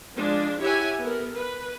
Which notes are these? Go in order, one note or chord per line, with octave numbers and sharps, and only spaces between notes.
F3 G#3 D4
E4 G4 C#5 E5 F#5 G#5
B3 A4 A#4
B4